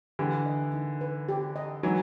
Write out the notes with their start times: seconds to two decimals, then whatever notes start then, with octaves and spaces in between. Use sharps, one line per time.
0.19 D3 E3 G4
0.46 D#5
0.74 D#4
1.01 B4
1.29 G4
1.56 D#5
1.83 E3 F#3 D#4